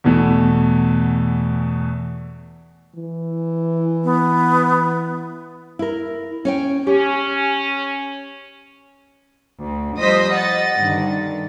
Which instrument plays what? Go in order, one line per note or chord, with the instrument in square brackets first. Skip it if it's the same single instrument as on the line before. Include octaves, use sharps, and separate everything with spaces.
[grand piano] E2 B2 E3 A3
[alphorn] E3
[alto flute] B3
[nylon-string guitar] E4 A#4
C#4 C#5 G5
[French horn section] C#4 [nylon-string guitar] G4
[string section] D2
F3 G3 C5 D#5 D#6 B6
D#5 F#5 A6
G2 D3 D#3